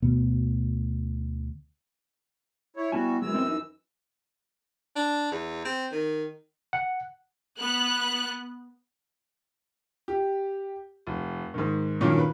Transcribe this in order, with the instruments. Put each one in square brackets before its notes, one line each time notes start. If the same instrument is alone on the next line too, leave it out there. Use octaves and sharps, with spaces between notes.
[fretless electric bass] D2 B2 B3
[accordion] E4 C#5
[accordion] G3 F#4 [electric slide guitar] B3 E4 G#5
[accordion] F#2 E3 E6 [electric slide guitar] F#3 G#3
[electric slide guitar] C4 C#5 D#5
D#4
[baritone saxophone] D4
E2
C4
D#3
[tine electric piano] F#5
[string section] B3 F#6
[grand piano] G4
F1
G#2 D#3
G2 A#2 D#3 F#3 A#3 C#4
B4